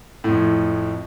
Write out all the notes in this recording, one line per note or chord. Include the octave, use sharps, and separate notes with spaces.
F2 A2